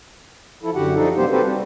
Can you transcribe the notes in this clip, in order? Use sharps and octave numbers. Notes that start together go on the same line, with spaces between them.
F3 E4 A4
F#2 D3 F#4 G4 F#5
F3 D4 D#4 A4
C3 G3 A#3 B3 G4 C5
C4 F#4 G4 A4 B4 C5
G3